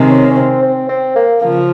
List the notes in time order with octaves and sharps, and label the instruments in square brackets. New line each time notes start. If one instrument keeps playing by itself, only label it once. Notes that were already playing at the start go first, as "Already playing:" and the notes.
Already playing: [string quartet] C3 D#3 G#3
[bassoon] C#4
C#4
C4
C4
C4
A#3
[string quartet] C#3 F3 [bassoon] A#3